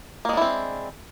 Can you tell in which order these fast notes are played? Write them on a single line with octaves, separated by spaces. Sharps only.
A#3 G#3 D4 E4 C4